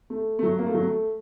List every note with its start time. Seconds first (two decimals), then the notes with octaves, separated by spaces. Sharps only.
0.10 A3
0.39 A3
0.43 F#3
0.59 A#3
0.66 A3
0.74 F#3
0.82 A3